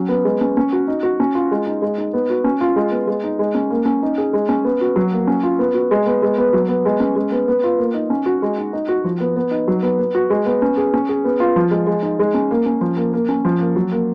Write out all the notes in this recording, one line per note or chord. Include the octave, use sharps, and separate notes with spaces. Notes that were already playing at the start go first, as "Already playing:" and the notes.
Already playing: F#3 C#4
B3
G#3
C#4
C#4
F#4
D#4
F#4
C#4
F4
G#3
D#4
G#3
D#4
B3
F#4
C#4
F4
G#3
B3
G#3
D#4
G#3
C#4
A#3
C#4
D#4
G#4
G#3
C#4
B3
F#4
F#3
A#3
C#4
F4
B3
F#4
G#3
B3
G#3
B3
F#3
B3
G#3
C#4
G#3
B3
B3
F4
A#3
D#4
C#4
F#4
G#3
D#4
D#4
F#4
F3
B3
B3
D#4
F#3
B3
B3
F#4
G#3
B3
C#4
G#4
C#4
G#4
B3
F4
F3
G#3
G#3
D#4
G#3
C#4
A#3
C#4
F3
A#3
A#3
C#4
F3
A#3
F#3
A#3